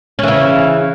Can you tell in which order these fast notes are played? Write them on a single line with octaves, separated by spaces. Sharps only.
C#4 E3 C#3